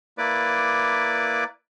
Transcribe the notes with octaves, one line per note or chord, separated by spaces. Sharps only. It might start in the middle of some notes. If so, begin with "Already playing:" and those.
A#3 E4 B4 D5 D6